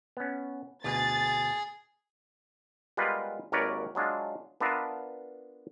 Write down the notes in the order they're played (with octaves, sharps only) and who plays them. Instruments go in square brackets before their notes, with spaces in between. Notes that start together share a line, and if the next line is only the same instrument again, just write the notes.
[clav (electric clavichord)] B3 C#4
[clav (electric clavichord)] D2 B2 [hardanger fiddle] G#4 [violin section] A6
[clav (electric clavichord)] G3 G#3 B3 F4 A#4 B4
G#1 D#2 A#4 B4 C#5 D5
F#3 G#3 D4 F4
B3 D4 F4 A#4 B4 E5